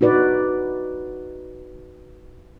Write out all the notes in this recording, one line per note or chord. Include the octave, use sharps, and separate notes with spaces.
D#4 F#4 B4 D5